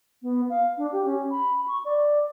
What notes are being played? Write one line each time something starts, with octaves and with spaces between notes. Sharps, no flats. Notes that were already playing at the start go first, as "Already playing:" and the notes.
B3
F5
D4
G4
C#4
B5
C#6
D5